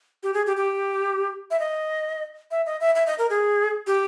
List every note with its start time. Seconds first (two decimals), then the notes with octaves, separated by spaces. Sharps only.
0.23 G4
0.34 G#4
0.46 G4
0.57 G4
1.51 E5
1.59 D#5
2.51 E5
2.66 D#5
2.80 E5
2.95 E5
3.07 D#5
3.18 A#4
3.30 G#4
3.87 G4